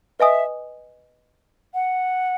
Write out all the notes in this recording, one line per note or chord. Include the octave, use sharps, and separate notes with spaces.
B4 D#5 E5 G#5 D#6
F#5